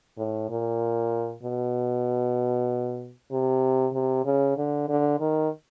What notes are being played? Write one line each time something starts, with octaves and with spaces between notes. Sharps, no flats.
A2
A#2
B2
C3
C3
C#3
D3
D3
D#3